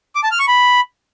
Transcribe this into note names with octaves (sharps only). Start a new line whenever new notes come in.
D6
A5
F6
C#6
B5